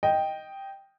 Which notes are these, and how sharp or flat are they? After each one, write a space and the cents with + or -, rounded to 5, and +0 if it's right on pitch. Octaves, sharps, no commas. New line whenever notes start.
D#5 +0 G5 +0